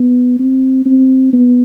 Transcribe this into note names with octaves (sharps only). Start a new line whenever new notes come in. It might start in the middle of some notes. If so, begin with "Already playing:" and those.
Already playing: B3
C4
C4
B3